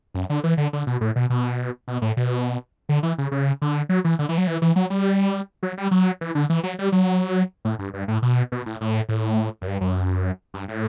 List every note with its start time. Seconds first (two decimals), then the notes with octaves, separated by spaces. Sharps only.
0.14 F#2
0.30 D3
0.44 E3
0.57 D3
0.73 D3
0.87 B2
1.01 A2
1.16 B2
1.30 B2
1.88 B2
2.02 A2
2.17 B2
2.89 D3
3.03 E3
3.18 C#3
3.32 C#3
3.62 D3
3.89 F#3
4.05 E3
4.19 D3
4.29 E3
4.38 F#3
4.47 E3
4.62 E3
4.76 F#3
4.90 G3
5.63 F#3
5.78 G3
5.91 F#3
6.21 E3
6.35 D3
6.50 E3
6.63 F#3
6.79 G3
6.92 F#3
7.65 A2
7.79 G2
7.94 G2
8.08 A2
8.22 B2
8.52 B2
8.66 A2
8.81 A2
9.09 A2
9.62 F#2
9.67 G2
9.81 F#2
10.54 G2
10.68 A2